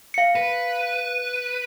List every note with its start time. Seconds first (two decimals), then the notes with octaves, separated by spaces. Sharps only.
0.14 F5 C#7
0.35 B4